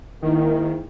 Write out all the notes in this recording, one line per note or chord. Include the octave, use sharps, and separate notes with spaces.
G#2 D#3 A#3 E4